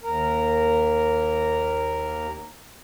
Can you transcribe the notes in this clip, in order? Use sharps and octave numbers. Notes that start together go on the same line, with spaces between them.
D#2 A#4